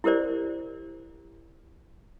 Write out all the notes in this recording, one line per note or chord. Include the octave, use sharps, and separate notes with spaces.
E4 G4 A#4 C5 D5